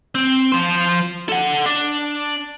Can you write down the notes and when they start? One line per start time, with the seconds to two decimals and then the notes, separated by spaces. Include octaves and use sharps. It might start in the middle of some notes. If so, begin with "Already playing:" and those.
0.15 C4
0.52 F3 C5
1.29 A4 F#5
1.66 D4